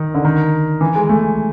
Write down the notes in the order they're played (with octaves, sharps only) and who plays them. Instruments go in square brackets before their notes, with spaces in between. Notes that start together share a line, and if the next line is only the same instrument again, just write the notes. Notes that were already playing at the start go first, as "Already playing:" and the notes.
Already playing: [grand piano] D#3
D3
D#3
E3
G#3
A3